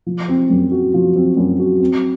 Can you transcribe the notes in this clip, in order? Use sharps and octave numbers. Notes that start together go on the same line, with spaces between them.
F3
C4
F#2
F#4
F3
C4
F#2
F#4
C4